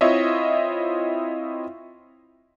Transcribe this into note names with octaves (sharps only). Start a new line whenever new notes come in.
C4 E4 F4 C#5 D#5 E5